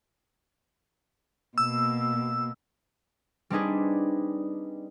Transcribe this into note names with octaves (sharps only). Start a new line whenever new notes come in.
B2 A#3 E6
G3 C4 D4 D#4 G#4 B4